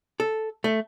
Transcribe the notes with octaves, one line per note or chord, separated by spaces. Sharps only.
A4
A3